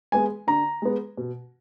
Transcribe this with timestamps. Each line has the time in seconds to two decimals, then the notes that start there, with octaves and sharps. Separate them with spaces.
0.12 G#3 B3 G#5
0.47 D3 A#5
0.82 G#3 B3
1.17 B2